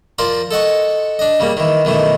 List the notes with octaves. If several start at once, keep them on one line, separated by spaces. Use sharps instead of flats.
F3 A#4 D5 C6
A4 D#5 F#5 C#6
D4 D#5
C#3 G3 A#3
D#3 E3
B1 D#3 E3 A3